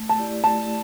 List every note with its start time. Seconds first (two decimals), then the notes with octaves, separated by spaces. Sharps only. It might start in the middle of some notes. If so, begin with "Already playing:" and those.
Already playing: A3
0.09 A5
0.18 E4 G4 D5
0.44 A3 A5